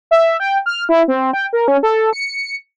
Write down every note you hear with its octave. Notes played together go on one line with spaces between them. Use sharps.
E5
G5
F6
E4
C4
G5
A#4
C#4
A4
C#7